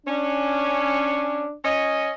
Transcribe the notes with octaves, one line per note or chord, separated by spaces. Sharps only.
C#4 D4
C#4 D#5